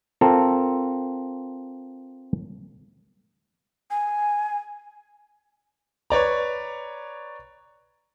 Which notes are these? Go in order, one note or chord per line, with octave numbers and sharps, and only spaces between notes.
C4 F4 A4 A#4
G#5
B4 C#5 D5 A#5